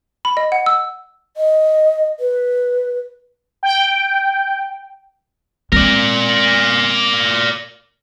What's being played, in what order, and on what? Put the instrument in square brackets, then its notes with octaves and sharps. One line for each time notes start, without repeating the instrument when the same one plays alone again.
[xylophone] B5
D#5
F#5
E6
[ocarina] D#5
B4
[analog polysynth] G5
[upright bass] G#3 C4 [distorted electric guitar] A#4 D5